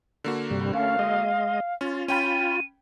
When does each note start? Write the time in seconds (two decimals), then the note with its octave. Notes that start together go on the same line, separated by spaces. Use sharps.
0.24 D3 A#3 F#4
0.50 G2 C3 G3
0.74 A3 C#4 F5
0.99 G#3 D#5
1.81 C#4 F4
2.08 C#4 G5 B5 D#7